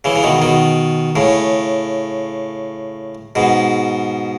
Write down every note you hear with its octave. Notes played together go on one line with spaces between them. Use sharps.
C#3 E3
C#3
B2 D#3
B2 D#3
A2 C#3
G#2 B2